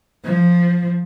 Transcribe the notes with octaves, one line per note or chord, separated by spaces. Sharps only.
F3